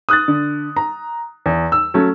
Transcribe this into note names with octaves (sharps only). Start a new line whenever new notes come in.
D#6 F#6 A6
D3
A#5
E2
E6
F#3 A3 C#4